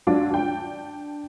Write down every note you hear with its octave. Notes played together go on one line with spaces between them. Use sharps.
F#3 D4 F4
D4 G5